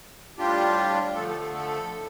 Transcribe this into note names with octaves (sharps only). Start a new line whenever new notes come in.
A2 G3 D4 F4 G4
D3 F3 A3 A4
A4
A4
A4
A2